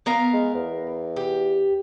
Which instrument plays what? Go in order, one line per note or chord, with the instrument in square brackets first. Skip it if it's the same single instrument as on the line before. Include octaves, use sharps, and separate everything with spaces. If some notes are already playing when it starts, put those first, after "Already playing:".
[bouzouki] B3 A#4 F5
[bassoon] G#3
E2
[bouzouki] G4